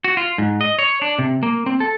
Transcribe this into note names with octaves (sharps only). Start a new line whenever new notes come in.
F#4
F4
G#2
D#5
C#5
D4
C3
A#3
C4
A4